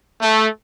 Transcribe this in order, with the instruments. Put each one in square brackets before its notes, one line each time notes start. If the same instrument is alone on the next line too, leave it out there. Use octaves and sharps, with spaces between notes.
[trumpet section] A3